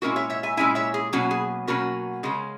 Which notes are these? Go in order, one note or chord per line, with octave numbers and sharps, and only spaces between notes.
A#2 G#3 C#4 E4 F#4 A#4
C#5 E5
C#5 E5
E5 G#5
A#2 G#3 C#4 E4 E5 G#5
C#5 E5
G#4
B2 F#3 A#3 C#4 F#4
G#4
B2 F#3 A#3 C#4 F#4 A#4
C#3 G#3 C#4